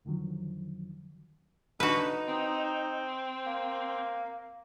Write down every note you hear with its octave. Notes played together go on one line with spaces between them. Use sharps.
F2 D3 D#3 F3 F#3
D3 D#4 F#4 B4
C4
A#3